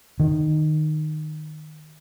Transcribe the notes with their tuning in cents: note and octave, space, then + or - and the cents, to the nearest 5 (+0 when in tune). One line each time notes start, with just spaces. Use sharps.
D#3 -15